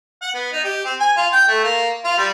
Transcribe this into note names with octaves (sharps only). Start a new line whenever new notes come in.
F#5
B3
D#4
G4
C4
G#5
F4
G5
A3
A#3
F4
G3